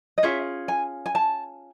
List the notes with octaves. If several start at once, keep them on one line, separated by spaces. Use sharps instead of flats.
D#5
C#4 F4 G#4 E5
G#5
G#5
A5